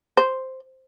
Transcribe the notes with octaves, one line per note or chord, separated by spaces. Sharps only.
C5